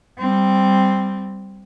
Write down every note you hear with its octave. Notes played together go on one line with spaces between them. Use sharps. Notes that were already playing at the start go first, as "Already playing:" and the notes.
G3 C4